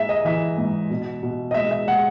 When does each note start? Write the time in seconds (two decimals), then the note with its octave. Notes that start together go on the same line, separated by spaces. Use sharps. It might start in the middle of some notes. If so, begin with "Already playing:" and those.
Already playing: G#2 G#3 E5
0.09 D#5
0.25 E3 E5
0.58 G#2
0.90 B2
1.23 B2
1.51 D#5
1.54 G#3 E5
1.71 E5
1.88 G#3 F#5